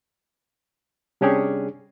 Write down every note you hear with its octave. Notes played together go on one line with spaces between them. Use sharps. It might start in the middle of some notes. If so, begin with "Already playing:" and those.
C3 G3 C#4 D4 G4 G#4